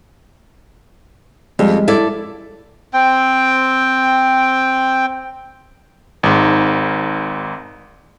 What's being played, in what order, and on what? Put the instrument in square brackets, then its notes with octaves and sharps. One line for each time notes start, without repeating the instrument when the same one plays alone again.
[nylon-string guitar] F2 [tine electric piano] G3 G#3
[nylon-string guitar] E4 A4 D5
[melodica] C4 G5
[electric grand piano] G#1 G#2